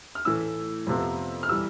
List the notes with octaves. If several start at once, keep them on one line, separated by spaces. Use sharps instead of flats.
F6
A2 E3 A3 E6
F2 C3 F3 B3
F6
E3 G3 E6